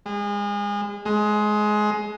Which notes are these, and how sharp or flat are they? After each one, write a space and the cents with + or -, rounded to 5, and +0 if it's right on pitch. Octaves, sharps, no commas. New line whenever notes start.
G#3 -30
G#3 +20